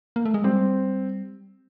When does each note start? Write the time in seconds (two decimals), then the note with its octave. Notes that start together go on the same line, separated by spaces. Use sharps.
0.16 A#3
0.25 A3
0.34 G#3
0.44 G3 C4